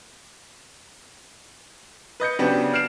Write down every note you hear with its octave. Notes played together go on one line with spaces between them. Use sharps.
B4 D#5 G6 C#7
C#3 F#3 B3 C4 D4 G4
F6 C7 D7 E7